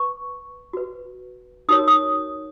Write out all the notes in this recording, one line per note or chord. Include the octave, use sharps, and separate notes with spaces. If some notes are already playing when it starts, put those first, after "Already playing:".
Already playing: B4 C#6
F#4 B4
D#4 F#4 A#4 C#5 D#6
D#6